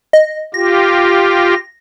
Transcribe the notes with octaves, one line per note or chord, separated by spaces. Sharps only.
D#5
F4 G4 A#6